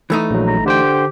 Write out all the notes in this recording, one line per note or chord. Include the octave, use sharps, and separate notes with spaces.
E3 A3 D#4
A#1 F#3
A#5
D3 G4 C5 G5